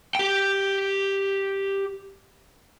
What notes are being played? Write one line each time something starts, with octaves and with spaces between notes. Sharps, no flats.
G4 G5